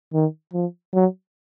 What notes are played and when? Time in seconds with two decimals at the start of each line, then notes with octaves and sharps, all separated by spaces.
0.14 D#3
0.53 F3
0.93 F#3